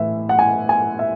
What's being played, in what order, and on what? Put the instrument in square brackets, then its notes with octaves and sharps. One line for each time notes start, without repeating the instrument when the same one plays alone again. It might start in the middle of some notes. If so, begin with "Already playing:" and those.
Already playing: [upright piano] A2 E3 E5
F#5
G#5
G#5
E5